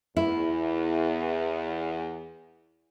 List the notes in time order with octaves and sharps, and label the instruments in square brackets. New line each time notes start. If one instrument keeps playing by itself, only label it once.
[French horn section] E2 [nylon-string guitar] E4